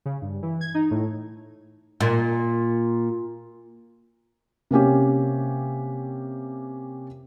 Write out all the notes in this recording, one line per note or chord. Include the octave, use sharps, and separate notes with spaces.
C#3
G2
E3
G#6
D#4
A2
A#2
C3 A#3 C#4 G4